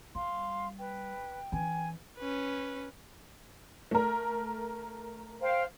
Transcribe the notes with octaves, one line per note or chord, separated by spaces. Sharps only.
G3 F5 C6
B4 G5
E3 C#4 G#5
C#4 B4
A3 A#4
C5 F5 G5